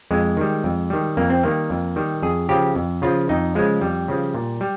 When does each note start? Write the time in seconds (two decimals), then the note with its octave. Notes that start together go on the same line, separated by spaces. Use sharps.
0.11 F2 G#3
0.37 D#3 G3
0.64 F2
0.90 D#3 G3
1.17 F2 A#3
1.30 C4
1.43 D#3 G3 A#3
1.70 F2
1.96 D#3 G3
2.22 F2 G#4
2.49 C#3 F3 G4
2.75 F2
3.02 C#3 F3 F4
3.29 F2 D#4
3.55 C#3 F3 G#3
3.81 F2 G3
4.08 C#3 F3
4.34 A#2
4.61 G3